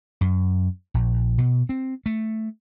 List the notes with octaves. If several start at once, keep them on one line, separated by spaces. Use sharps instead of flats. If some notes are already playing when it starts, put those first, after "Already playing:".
F#2
A#1
B2
C4
A3